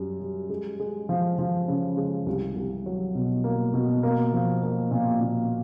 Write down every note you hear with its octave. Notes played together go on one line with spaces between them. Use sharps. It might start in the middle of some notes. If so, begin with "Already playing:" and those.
Already playing: F#2 G3
G3
G#3
G#3
F3
F3
C#3
G#3
C2
C2
F#3
B2
A#3
B2
A#3
F3
A#3
A#2
A#2